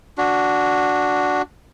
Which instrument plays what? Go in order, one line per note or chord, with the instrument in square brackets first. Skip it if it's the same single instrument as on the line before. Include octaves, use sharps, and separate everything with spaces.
[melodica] D4 F#4